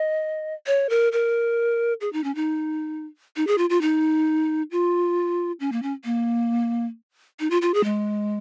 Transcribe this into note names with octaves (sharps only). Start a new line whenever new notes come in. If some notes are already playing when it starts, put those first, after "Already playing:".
Already playing: D#5
C#5
A#4
A#4
G#4
D#4
C#4
D#4
D#4
G#4
F4
F4
D#4
F4
C#4
A#3
C#4
A#3
D#4
F4
F4
G#4
G#3